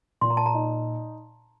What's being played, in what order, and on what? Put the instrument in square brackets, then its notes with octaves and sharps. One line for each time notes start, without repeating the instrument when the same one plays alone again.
[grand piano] A#2 [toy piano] C6
[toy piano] A#5
A5
A#5
[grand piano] D#4